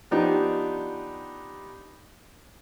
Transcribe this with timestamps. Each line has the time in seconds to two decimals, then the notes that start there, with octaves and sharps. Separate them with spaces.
0.11 F3 B3 D4 D#4 G4